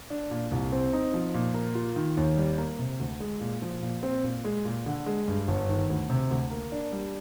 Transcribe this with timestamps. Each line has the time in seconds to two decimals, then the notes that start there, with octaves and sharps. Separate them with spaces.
0.10 D4
0.31 A#2
0.51 C2
0.72 C4
0.93 D#4
1.14 F3
1.34 A#2
1.54 A#3
1.75 F4
1.96 D#3
2.17 D#2
2.37 G3
2.58 A#3
2.79 C3
3.00 D2
3.20 G#3
3.41 A#2
3.62 F3
3.82 A#2
4.03 C4
4.24 A#2
4.45 G#3
4.65 A#2
4.86 D3
5.06 G#3
5.28 G2
5.48 G1
5.69 D#3
5.90 D2
6.10 C3
6.31 D2
6.51 A#3
6.72 D4
6.92 G3